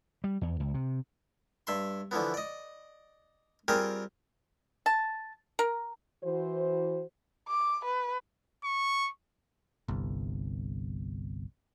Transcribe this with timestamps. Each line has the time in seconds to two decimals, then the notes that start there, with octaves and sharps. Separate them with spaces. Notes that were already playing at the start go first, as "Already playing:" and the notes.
0.24 G3
0.41 E2
0.60 C#2
0.74 C3
1.67 G2 E5 C6
2.11 D3 E3 F3 B3
2.34 D5 D#5
3.68 G3 C4 F4 G4 G#4 A#4
4.86 A5
5.59 A#4
6.23 E3 F#4 C5
7.48 D6
7.85 B4
8.64 C#6
9.88 G1 C2